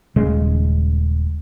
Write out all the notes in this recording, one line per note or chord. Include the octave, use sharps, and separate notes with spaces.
D#1 C#3 G#3